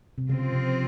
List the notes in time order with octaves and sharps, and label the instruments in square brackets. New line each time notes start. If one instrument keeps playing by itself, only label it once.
[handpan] C3
[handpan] C#3 [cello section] F3 C4 F4
[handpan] C3